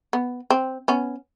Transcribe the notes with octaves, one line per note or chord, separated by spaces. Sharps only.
B3
C4
B3 C#4